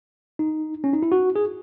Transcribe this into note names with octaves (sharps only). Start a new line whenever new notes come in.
D#4
C#4
D#4
E4
F#4
G#4